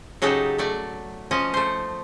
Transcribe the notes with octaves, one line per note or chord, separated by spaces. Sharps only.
C#3 F#3 D#4 G4 A4
F#3 A3 D5
F3 C#4 D#5
A3 C5